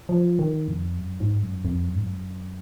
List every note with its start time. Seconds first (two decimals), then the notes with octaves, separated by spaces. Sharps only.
0.09 F3
0.39 D#3
0.68 F2
0.98 F#2
1.20 G#2
1.42 F#2
1.65 F2
1.88 F#2
1.95 G#2
2.03 F#2